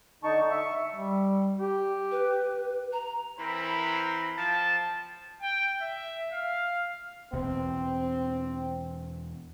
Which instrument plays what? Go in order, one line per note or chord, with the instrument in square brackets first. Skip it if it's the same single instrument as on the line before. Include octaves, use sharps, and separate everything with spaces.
[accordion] D3 D#4 A5 C#6
E5 C#6
[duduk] G3
G4
[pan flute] B4
A#5
[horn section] E3 C4 A#4 C5 B5
F3 G5 A5
[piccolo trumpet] G5
E5
F5
[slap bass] E2 B2 B3 [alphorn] C4